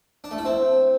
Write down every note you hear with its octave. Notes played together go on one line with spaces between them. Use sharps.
D4
A3
E4
C4